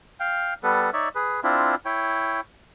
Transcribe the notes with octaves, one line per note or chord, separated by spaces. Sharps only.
F5 G5
G3 B3 A4 B4
D#4 C#5 D5 E5
G#4 B4
C4 D4 E4 F4
E4 C#5 G5